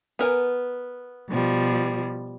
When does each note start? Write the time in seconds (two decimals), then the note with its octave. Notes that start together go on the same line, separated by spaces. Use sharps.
0.19 B3 A#4 G#5
1.29 B2 F3 G3